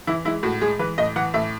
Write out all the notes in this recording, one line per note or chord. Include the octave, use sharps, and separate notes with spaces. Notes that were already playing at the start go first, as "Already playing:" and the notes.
E3 E4
G#3 E4
A2 F#4
G#3 G#4
E3 B4
A2 D#5
E3 F#5
A2 E5